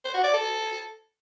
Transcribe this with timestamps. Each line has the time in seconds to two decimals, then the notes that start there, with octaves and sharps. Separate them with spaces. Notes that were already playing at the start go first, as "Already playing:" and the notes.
0.05 C5
0.14 F#4
0.24 D5
0.34 A4